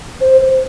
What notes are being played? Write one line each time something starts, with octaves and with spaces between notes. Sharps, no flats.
C5
C5